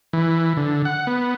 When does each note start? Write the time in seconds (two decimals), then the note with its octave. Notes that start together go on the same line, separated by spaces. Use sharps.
0.13 E3
0.57 D3
0.85 F#5
1.07 B3